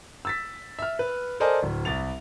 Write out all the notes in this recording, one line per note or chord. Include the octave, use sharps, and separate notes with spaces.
E6 A6 B6
E5 F6
B4
A4 A#4 C5 D5 D#5 G#5
D1
C2 A6 F7